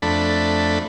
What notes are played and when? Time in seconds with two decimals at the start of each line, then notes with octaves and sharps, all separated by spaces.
0.02 F2 A3 D4 B5